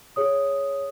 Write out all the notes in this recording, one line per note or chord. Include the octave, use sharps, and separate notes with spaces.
G#4 C#5 D#6